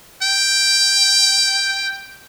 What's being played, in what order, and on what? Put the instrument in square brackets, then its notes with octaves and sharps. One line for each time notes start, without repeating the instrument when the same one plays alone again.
[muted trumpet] G5